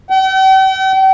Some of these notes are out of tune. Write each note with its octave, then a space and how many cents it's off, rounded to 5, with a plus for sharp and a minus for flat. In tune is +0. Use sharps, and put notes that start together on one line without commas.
G5 -45